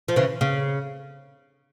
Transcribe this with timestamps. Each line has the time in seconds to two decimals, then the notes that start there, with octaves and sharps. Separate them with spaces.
0.08 F3
0.16 C#3 E3
0.41 C#3